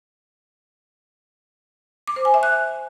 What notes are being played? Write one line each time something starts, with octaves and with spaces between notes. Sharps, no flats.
D6
C5
G#5
E5
F#6